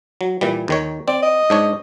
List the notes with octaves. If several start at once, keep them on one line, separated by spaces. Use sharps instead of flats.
F#3
A#2 E3 G3
D#2 D#3 C#5
C4 D5
D#5
G#2 D4 C#5